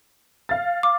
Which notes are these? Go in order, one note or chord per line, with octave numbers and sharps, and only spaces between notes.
F5 A6
D6